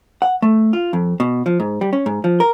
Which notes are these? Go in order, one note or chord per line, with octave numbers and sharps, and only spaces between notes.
F#5
A3
F4
F2
B2
F3
G#2
G3
C#4
G#2
F3
A#4